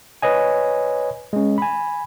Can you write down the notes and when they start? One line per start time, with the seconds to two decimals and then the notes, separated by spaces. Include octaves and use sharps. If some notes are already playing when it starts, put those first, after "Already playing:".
0.22 B4 C#5 D#5 G#5
1.33 G#3 C#4
1.58 G#5 B5